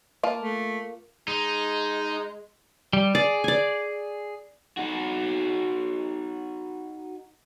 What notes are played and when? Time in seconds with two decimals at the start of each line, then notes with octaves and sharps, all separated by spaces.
0.23 A#3 F4 A5
0.40 A3
1.28 G#3 D#4
2.93 G3
3.15 G#4 D5
3.44 D5 G#5
4.78 D#4 F#4